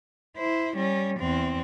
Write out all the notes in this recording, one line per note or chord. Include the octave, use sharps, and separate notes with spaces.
E4 C5
G3 C#4
E2 C4